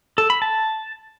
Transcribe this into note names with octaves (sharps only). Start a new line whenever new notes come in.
A4
B5
A5